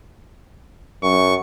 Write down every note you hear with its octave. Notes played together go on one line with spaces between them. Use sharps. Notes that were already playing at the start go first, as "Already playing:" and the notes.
F#2 C#6